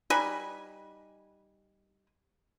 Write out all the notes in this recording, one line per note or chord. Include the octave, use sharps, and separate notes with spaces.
G3 D#4 B4 G#5